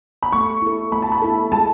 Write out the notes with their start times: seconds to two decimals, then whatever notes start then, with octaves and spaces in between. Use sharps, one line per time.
0.23 B5
0.32 A3 C#6
0.62 E4 A4
0.92 A3 B5
1.02 A5
1.12 B5
1.22 E4 A4
1.52 G#3 A5